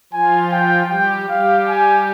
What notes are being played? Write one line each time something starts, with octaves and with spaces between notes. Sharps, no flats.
F3 F4 G#5
G5
G3 G4 G5
G3 G4 F5
G#5